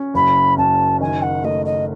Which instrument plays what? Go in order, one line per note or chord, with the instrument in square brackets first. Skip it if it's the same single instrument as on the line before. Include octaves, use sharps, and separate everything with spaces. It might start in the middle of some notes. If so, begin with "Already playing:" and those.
Already playing: [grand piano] C#4
[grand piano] F#1 [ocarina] B5
[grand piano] F#2 [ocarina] A5
[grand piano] D#3 [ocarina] G#5
[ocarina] F#5
[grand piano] A3 [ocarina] D#5
[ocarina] D#5